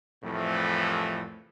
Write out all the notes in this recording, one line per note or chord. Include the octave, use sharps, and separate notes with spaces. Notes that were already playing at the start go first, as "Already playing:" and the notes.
C2 F2 A2 E3 F3 A3